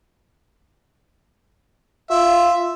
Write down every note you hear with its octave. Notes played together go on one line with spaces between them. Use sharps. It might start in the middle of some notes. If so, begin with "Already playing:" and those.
F4 E5